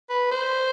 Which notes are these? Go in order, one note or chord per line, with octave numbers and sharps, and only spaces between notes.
B4
C5